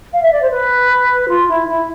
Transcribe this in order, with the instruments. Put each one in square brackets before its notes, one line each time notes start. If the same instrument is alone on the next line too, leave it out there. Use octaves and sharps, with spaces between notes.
[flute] F5
E5
D5
C5
B4
F4
E4
E4